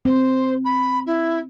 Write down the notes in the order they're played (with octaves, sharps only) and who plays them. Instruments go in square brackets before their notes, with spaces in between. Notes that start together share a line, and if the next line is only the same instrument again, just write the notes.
[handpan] C4 [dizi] C5
[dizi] B5
E4